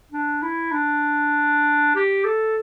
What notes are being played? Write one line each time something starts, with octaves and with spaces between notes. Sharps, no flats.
D4
E4
D4
G4
A4